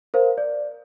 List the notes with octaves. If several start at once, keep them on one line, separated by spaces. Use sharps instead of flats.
A#4 C5 F5
D5